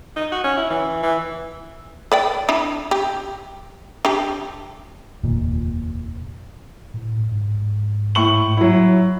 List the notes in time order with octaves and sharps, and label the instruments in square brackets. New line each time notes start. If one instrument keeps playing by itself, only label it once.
[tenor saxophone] D#4
F#4
C#4
E4
E3
E3
[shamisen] B4 D5 G5
D4 E4
G4
D4 G4
[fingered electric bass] F1 D#2 A#2
[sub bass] A2
G#2
[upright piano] A2 C#6 F#7
F#3 E4